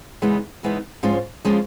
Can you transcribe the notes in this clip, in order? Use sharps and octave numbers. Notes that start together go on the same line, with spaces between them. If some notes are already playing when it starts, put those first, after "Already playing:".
C#3 E3 G#3 B3 D#4
C#3 E3 G#3 B3 D#4
G#2 F3 G#3 C#4 F4
F3 G#3 C#4 F4